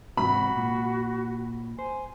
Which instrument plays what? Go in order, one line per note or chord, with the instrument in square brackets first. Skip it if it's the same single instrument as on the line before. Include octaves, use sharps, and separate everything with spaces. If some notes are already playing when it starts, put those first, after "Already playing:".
[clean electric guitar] E2 G#2 C3 [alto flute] F#4 [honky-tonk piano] B5
[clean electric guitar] A#2
[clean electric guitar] C5 [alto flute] G#5